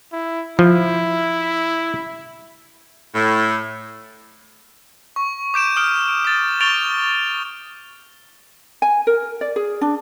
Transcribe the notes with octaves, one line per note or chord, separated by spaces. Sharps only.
E4
F3 E4
A2
C#6
D6 G6 D7 E7
D#6 F6 D7
D6 A6
C#6 A6 D7 F7 G7
G#5
A#4
D5
G#4
D4